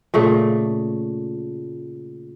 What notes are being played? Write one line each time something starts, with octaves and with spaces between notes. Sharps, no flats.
A#2 C#3 A3